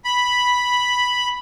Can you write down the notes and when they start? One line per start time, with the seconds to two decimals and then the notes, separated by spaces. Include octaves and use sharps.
0.05 B5